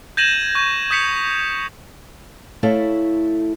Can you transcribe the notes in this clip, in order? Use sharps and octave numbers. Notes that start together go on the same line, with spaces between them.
G6 G#6 A#6 D#7 E7 F#7
C#6 G6 D#7
D#6 G6 B6 C#7 F7
A3 E4 A4 C#5 F5